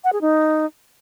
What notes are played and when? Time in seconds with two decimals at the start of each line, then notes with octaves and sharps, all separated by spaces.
0.04 F#5
0.13 G#4
0.21 D#4